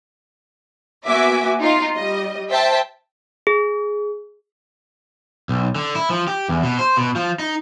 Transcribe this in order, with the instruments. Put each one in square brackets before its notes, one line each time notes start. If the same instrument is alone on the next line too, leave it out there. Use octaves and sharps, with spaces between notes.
[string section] A#3 B3 F#4 E5 G#5 D6
D#4 F4
G3 D#5
C5 E5 G5 A5
[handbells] G#4
[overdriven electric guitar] B1
D3
E4
F3
G4
E2
B2
C5
B2
F3
D#4